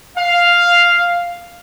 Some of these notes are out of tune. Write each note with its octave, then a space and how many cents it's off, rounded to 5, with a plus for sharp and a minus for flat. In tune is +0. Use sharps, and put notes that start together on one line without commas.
F5 +0